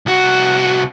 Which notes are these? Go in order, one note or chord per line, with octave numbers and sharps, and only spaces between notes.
C2 F#4